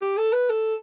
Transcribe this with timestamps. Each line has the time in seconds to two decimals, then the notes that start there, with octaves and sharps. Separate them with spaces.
0.02 G4
0.18 A4
0.33 B4
0.50 A4